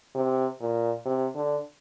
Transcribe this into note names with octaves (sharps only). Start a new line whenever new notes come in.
C3
A#2
C3
D3